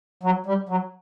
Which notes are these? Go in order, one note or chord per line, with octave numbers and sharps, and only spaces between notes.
F#3
G3
F#3